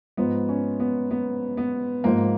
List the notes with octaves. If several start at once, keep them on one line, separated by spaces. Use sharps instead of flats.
G#2 F3 B3
C#4
B3
B3
B3
G#2 F3 A#3